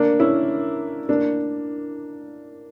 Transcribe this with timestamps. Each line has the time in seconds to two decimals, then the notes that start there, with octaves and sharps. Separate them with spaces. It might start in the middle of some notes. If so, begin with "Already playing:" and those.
Already playing: A#3 D4
0.19 C#4 E4
1.09 A#3 D4